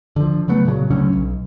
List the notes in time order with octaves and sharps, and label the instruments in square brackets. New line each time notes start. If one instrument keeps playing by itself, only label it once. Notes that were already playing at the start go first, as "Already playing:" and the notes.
[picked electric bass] D3 F3
C#3 F#3 A3 B3
A#2 C#3 E3 F#3
D2 C#3 F#3 C#4
B1